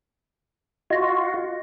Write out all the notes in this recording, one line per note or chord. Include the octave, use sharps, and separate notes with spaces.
F4 F#4 D#5 A#6